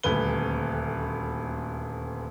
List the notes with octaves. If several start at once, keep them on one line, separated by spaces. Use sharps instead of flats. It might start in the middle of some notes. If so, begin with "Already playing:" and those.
D#1 D2 B4 G7